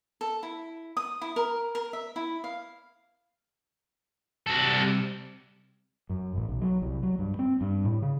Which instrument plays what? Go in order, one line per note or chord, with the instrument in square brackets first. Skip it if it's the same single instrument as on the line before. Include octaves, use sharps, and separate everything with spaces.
[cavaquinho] A4
E4
D#6
E4
A#4
A#4
E5
E4
F5
[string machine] C3 G3 [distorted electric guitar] F#4 A4
[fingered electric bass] F#2
A1
B1
F#3
C2
F#3
G2
C4
G2
A2
C#3